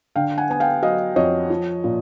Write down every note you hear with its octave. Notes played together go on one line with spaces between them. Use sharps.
D3 F5 G5
F#5 G#5
B3 G#5
F5 G5
F#3 D#5 F5
F2 C#5 D#5
F3
A#2